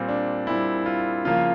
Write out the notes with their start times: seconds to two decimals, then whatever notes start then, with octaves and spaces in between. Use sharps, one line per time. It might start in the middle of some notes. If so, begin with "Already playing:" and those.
Already playing: A#2 G3 C4
0.09 D4
0.47 A#2 G3 C4 E4
0.86 F4
1.25 C#3 F3 A#3 F4